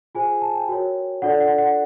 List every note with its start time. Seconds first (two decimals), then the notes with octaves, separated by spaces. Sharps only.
0.15 F4 G#4 C5 G#5
0.42 A5
0.55 G5
0.68 F#4 A#4 C#5
1.22 D4 F4 A4 D5 F#5
1.40 F#5
1.58 F#5